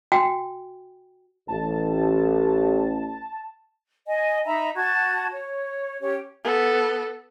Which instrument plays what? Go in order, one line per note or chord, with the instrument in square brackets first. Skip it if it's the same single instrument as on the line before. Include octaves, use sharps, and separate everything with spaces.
[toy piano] F#4 G5 G#5
[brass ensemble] A1 [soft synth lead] A5
[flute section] D#5 G#5
D#4 E5 A#5 B5
F#4 A5 G#6
C#5
C#4 G4 C#5
[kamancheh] B3 A4